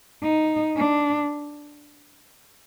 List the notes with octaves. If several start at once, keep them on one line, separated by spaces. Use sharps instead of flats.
D#4
D4